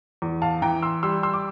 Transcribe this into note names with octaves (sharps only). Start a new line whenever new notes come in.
E2
F5 A5
E3 G5 A#5
C6 E6
G3 C6 E6
C6 E6
D6